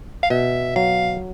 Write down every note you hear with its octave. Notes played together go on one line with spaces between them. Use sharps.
F5
B2 E5
F#3 F5